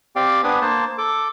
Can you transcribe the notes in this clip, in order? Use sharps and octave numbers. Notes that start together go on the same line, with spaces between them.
C4 G4 D5 F5 G5
B3 D4 B4 G#5 D#6
A#3 C5 A5
A4 D6